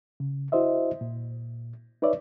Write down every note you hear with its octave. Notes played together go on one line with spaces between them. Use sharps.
C#3
E4 F#4 C5 D#5 E5
A#2
D#4 B4 C#5 D5 E5